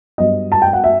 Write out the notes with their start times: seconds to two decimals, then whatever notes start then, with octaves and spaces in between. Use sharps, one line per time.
0.18 G2 F#3 B3 D#5
0.52 A5
0.62 G5
0.73 F#5
0.84 E5